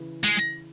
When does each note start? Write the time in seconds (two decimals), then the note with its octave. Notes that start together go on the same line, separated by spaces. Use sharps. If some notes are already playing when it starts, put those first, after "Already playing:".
Already playing: C#3 E3
0.24 G#3